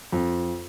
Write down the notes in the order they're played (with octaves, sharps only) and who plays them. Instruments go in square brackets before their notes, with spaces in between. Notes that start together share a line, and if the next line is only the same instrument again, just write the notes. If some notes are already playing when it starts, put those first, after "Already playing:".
[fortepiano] F2